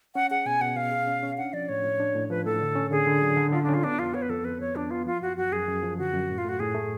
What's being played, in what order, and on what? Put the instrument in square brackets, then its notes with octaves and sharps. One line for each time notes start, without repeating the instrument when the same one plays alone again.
[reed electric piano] C#4 [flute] F#5
[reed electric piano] G#4 [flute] F#5
[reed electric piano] B2 [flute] G#5
[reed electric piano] B2 [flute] F#5
[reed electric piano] B2 [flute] F5
[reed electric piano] G#4
C#4
C#4
[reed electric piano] D4 [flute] F#5
[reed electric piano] F3 [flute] D5
[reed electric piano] A2 [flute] C#5
[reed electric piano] A2
D4
A2
[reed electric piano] F3 [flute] B4
[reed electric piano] A2 [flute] A4
[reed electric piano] D3
C#4
[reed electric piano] D3 [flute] G#4
[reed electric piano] D3
F#3
D3
[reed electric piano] D3 [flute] F4
[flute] D4
[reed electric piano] C#4
[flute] F4
[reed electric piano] B3 [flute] D4
[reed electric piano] F2 [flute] F4
[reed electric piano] B3 [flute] C#5
[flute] B4
[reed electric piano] F2 [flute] A4
[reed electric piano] F2 [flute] B4
[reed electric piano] F2 [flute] C#5
[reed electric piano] F2 [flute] D4
[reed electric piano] B3 [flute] F4
[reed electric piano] F3 [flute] F4
[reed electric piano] F#2 [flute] F#4
[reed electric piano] F#2 [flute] F#4
[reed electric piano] F#2 [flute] G#4
[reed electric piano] F#2
F3
[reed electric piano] D3 [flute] F#4
[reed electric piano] F#2
A2
[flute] F4
[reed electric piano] A3 [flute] F#4
[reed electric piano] A2 [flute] G#4
[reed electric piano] A3